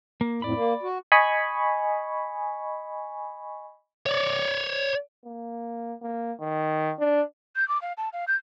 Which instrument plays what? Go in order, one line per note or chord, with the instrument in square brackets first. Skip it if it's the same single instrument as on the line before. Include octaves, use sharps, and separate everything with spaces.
[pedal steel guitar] A#3
[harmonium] F2 A2 [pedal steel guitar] D5 B5
[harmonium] A#3
F#4
[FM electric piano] D#5 G#5 B5 C#6
[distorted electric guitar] C#5 D5
[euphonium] A#3
A#3
D#3
D4
[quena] G6
D6
F5
A5
F5
G6